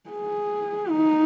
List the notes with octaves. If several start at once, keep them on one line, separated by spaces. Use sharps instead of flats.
G#4
D#4